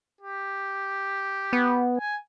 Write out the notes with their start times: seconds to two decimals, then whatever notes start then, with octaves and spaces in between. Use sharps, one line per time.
0.21 G4
1.53 B3
1.98 G#5